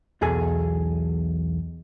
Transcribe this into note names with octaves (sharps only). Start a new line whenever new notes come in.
B1 E2 G#4 A4 G#5